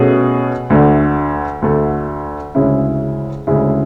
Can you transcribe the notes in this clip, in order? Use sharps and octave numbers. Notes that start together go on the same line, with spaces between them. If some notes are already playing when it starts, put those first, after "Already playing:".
Already playing: B2 A3 C#4 G#4
D2 D3 A3
D2 D3 A3
D2 C#3 G#3 C#4 E4
D2 C#3 G#3 C#4 E4